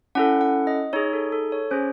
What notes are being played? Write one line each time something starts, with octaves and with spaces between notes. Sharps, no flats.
C#4 E4 A4 F#5
F#5
D#5
D#4 G#4 C#5
A4
A4
C#5
C#4 G#4 C5